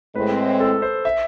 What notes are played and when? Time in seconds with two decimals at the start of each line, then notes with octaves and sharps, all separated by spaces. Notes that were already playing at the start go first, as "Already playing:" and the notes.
0.15 A2 G#3 C4 B4
0.60 A4
0.82 C5
1.05 E5